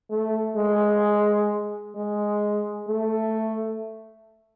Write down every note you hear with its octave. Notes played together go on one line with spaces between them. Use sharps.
A3
G#3
G#3
A3